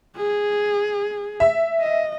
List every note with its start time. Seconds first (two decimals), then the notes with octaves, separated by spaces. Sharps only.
0.16 G#4
1.40 E5
1.80 D#5